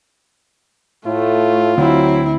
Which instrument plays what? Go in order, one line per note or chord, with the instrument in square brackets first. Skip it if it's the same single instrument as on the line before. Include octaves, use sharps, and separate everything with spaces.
[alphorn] A2 [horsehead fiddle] A3 [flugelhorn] F4
[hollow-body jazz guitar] D2 [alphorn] F#3 [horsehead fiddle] C4 E4